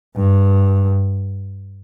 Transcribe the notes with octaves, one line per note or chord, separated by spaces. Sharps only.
G2